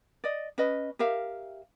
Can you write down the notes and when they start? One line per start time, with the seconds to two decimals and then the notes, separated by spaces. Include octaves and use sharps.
0.24 D5 D#5
0.58 C#4 B4 D#5
0.99 G4 A#4 E5 F5